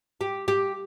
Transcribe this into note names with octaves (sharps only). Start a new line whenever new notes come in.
G4
G4